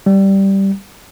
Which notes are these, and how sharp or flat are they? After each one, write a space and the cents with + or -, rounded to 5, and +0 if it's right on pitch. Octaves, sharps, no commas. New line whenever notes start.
G3 -5